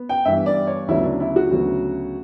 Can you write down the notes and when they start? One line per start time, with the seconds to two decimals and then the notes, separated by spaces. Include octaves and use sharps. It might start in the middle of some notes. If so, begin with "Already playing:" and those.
Already playing: B3
0.09 G5
0.25 G2 E3 B3 E5
0.46 D5
0.67 C#5
0.88 D2 C#3 F#3 B3 E4
1.04 D4
1.20 E4
1.36 F#4
1.51 D2 C#3 F#3 B3